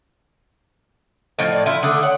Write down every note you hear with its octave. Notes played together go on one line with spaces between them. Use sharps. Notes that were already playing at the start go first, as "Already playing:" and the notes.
A2 F3 D#5
D5
E4 F4 E5
D3 A3 D#6
C#5 F#5